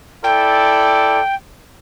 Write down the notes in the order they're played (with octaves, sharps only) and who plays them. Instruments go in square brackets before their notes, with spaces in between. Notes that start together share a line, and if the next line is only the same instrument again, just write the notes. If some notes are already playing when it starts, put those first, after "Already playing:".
[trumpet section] E4 A4 D5 [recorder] G5